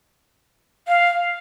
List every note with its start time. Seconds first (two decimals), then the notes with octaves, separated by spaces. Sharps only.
0.88 F5